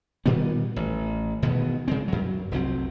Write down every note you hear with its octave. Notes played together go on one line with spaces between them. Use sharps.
A#2 D#3 G3 B3
A1
E1 B2 D#3 B3
C#3 G#3 C4
F#2 F#3
F1 C2 F#3 C4